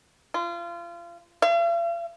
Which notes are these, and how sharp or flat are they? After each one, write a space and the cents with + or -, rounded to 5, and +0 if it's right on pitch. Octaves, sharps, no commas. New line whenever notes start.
F4 -30
F5 -45